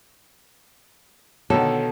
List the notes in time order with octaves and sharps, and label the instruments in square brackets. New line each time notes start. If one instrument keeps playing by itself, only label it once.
[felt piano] B2 [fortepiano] D3 D#3 [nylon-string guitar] A4 [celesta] C#5